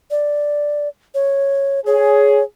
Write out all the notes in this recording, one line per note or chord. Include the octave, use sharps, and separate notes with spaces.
D5
C#5
G#4 C#5